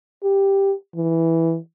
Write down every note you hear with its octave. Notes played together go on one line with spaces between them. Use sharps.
G4
E3